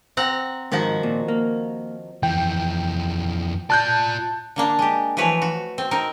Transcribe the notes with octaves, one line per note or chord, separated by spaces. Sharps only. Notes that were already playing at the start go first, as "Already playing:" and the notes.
C4 F#5 A#5
G#2 D#3 F3 F#4
A#2
A#3
F2 E3 G5
F4 D5 A5 F#6 G6
D3 A#3 D4
G#3 G4
E3 F3 A3 B4 C#5
F#4
C4
C4 D#4 A#4